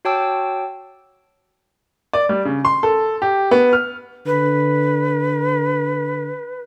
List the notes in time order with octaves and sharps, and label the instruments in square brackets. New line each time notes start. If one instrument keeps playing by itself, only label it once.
[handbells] F#4 C#5 G5 A5 D6 E6
[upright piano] D5
G3
C#3
C6
A4
G4
B3
F6
[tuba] D3 [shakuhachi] B4